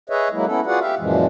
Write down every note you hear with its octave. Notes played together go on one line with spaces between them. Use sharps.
G#4 B4 C#5 D#5 E5
F#3 G#3 A#3 E4
B3 C#4 E4 A4
F4 F#4 G#4 B4 D5 F#5
G4 E5 F5
F#2 A#2 E3 F3 G#3